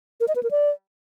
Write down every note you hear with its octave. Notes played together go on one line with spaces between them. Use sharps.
A#4
D#5
B4
A#4
D5